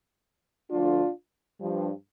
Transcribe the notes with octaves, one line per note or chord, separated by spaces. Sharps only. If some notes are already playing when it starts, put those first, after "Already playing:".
D2 D3 F3 D4 F4
G2 F3